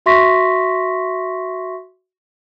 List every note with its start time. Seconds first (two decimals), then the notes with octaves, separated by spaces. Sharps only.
0.06 F#4 E5 C6 C#6 A#6 B6